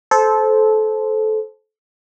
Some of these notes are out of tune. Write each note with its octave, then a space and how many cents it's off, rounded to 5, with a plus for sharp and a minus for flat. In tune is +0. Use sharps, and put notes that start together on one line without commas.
A4 -20 C5 +0